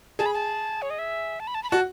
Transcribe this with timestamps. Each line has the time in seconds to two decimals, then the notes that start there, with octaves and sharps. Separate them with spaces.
0.19 G#4 A5
0.26 B5
0.34 A5
0.82 C#5
0.90 D#5
0.99 E5
1.40 A5
1.47 B5
1.55 A5
1.63 B5
1.70 F#4 A5